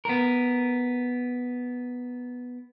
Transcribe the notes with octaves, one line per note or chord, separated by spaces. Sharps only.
B3 A#4